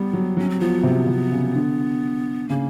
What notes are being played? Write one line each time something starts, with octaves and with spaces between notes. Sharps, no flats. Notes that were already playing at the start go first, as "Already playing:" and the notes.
Already playing: G3 B3
F#3
F#3 C#4
C4
F3 B3
C3
C3
C#3
D3
C#3 A#3